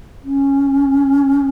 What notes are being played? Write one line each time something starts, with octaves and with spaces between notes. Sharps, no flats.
C#4